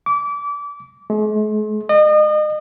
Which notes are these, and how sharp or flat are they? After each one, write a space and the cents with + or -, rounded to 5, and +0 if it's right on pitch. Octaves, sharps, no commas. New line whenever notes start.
D6 -30
G#3 +45
D#5 -35